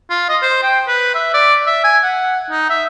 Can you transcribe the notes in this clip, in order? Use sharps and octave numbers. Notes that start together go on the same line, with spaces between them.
F4
D#5
C5
G5
B4
E5
D5
E5
G#5
F#5
D#4
E5